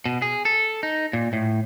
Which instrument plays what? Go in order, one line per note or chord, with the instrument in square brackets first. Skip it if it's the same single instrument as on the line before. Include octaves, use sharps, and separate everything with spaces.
[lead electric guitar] B2
G#4
A4
D#4
A#2
A2